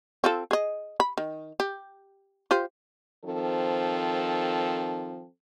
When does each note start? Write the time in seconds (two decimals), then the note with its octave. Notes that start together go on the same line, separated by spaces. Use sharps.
0.24 C4 F4 A4
0.51 G#4 D#5
1.00 B5
1.18 D#3
1.60 G4
2.51 F4 G4 C5
3.25 D#3 F3 C4 A4